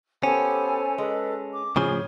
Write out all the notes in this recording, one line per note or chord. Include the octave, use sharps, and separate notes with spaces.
B3 C#4 G4 A4 C5 G#5
G#3 A4 B4
D6
A2 C#3 F3 G#4 C#5